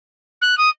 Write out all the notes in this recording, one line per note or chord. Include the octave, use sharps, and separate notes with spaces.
F#6
D#6